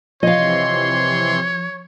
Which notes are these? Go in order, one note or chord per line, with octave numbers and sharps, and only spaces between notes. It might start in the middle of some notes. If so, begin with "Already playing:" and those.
C3 E3 F3 C#5 D#5 F5 C6